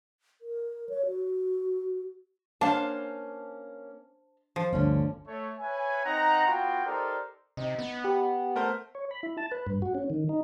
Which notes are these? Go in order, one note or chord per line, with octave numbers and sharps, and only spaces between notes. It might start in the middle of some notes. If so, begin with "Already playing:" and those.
A#4
C#5
F#4
A#3 C#4 D4 C5 F5 A5
F3
G1 D2 D3 C#4
A3 C#5
B4 C#5 E5 G#5
C4 D#4 F#5 A#5
B3 F4 F#4 G5
D#4 G4 A4 A#4 C5 D5
C3 D#4
B3
G4
A3 A#4 C5
C#5
B5
E4
A5
B4
G2
F#4
C#4
D#3
D#4